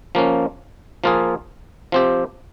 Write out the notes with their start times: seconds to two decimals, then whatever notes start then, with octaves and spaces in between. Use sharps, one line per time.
0.15 F3 A#3 C#4
1.04 F3 A#3 F4 G#4
1.92 F3 C4 G4